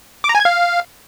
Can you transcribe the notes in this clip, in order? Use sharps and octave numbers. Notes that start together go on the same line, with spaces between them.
D6
A#5
G#5
G#6
F5